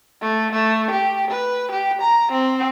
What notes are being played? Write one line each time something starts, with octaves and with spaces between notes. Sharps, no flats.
A3
A3
G4
B4
G4
A#5
C4